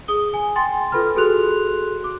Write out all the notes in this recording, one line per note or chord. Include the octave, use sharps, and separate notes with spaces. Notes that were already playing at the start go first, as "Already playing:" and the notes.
G#4 D#6 G7
G#5
G5 G#5 C6 A6
F4 A4 B4 B5 F6
F#4 G#4 A4 C6 F#6 F7
D6